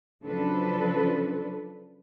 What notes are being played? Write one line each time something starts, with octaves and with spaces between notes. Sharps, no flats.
C#3 F3 F#3 D4 A4 B4